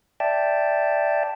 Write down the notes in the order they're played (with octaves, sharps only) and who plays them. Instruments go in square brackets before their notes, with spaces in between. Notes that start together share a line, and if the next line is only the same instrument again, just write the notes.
[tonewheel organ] D5 E5 G5 A5